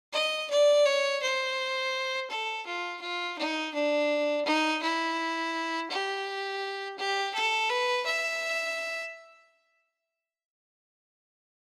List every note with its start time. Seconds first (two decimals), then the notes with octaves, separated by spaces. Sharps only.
0.13 D#5
0.50 D5
0.86 C#5
1.22 C5
2.30 A4
2.66 F4
3.01 F4
3.38 D#4
3.75 D4
4.45 D#4
4.83 E4
5.91 G4
6.98 G4
7.34 A4
7.70 B4
8.06 E5